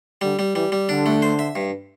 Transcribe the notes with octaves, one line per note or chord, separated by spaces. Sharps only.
D3 G3
G3
E3 G3
G3
D3 D4
A3
C5
E5
G2